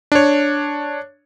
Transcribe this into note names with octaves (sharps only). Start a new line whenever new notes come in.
D4 C#5